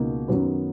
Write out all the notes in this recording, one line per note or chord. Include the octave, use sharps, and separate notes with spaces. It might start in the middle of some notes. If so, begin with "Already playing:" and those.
Already playing: C#2 B2 A#3 D#4
F#2 D#3 F#3 B3